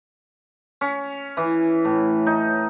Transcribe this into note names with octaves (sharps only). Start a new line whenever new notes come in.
C#4
E3
A2
D#4